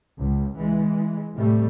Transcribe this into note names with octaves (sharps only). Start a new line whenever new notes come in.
C#2
E3 G#3
A2 C3 G3 A3